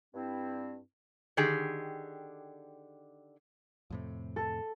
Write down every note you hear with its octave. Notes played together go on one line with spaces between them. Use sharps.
G2 C4 E4
D3 D#3 G4 G#4
F2 A2 C3
A4